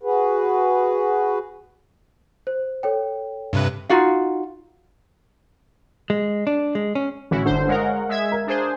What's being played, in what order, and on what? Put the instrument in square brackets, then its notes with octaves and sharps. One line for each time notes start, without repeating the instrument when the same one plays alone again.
[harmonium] F#4 G#4 B4
[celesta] C5
A4 C#5 G5
[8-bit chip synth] G2 C3 B4
[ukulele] D#4 F4 F#4 F5
[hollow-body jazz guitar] G#3
D4
G#3
C#4
[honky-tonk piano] A1 [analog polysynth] C#4 E4 F#4
[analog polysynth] G1 C5 [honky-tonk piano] D3
[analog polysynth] G#3 A#4 [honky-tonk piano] C#5 F5 F#5
[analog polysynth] G#3 E5 G#6
[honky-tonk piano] A#4 F5
[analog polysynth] D4 G#4 C5